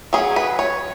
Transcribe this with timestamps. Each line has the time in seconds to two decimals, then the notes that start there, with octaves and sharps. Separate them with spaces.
0.13 F#3 C#4 G#4
0.36 B4
0.59 C#5